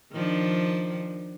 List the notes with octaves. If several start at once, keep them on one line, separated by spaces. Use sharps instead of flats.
D#3 F3 D4